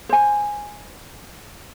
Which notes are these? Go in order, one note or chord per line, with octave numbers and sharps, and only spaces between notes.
C5 G#5